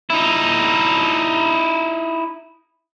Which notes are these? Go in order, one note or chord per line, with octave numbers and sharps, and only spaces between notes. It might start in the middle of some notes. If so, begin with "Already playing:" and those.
D#4 E4